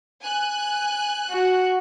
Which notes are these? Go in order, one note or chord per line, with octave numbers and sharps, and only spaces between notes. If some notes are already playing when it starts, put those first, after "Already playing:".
G#5 F#6
F#4